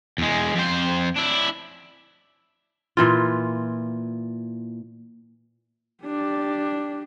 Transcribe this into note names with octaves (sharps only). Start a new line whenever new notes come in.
E2 G#3
F2 C5
D4 E4
A#2 E3 F4
D4 G4